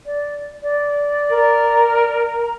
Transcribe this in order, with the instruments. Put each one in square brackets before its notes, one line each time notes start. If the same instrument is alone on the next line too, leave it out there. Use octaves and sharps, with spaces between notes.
[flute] D5
D5
[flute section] A#4
[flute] A#5